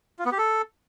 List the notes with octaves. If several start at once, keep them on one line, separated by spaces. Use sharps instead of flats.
F4
B3
G4
A4